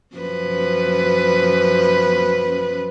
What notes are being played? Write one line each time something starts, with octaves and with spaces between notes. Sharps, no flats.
F#2 F3 B4